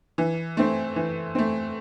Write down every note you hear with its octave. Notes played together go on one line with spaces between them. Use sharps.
E3
A3 C4
E3
A3 C4